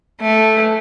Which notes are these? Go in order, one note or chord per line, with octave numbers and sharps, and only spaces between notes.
A3